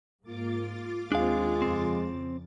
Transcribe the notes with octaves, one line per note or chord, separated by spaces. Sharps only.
G#2 A#3 F4 D6 A6
D#2 G#3 C4 D4 F5
F2 C#3 C4